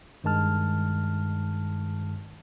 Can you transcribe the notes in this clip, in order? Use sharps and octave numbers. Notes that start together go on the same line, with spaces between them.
G2 D#3 G#3 A5 F6